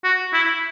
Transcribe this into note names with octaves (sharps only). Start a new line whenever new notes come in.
F#4
E4